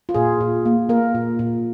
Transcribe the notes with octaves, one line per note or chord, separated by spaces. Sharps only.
F4
A#2 G#4
A#2
A#3
A#3 A#4
A#2
A#2